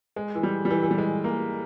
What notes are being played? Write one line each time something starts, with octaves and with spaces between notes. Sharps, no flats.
G#3
E3
G3
G3
E3
E3
G3
G#3
A#3